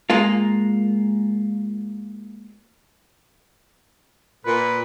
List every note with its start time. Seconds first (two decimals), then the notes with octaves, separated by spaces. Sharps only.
0.10 G#3 A#3 F4
4.46 A#2 B4